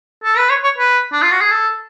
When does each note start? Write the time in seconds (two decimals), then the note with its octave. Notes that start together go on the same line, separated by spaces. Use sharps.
0.24 A4
0.37 B4
0.50 C#5
0.64 C#5
0.78 B4
1.13 D4
1.22 F4
1.32 F#4
1.41 G#4
1.51 A4